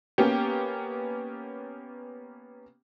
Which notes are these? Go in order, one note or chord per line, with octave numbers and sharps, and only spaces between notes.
A#3 B3 C#4 G4